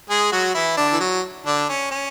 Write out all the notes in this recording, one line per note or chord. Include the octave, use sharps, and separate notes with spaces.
G#3 G#4
F#3 F#4
E3 E4
D3 D4
E3
F#3
D3 D4
C#4
C#4